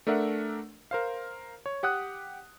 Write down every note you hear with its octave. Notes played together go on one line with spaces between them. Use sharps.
A3 D4 A#4 E5 F#5
A#4 C5 F5
C#5
G4 F#5 D#6 F#6